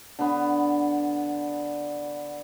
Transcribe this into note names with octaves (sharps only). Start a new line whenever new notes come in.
D3 B3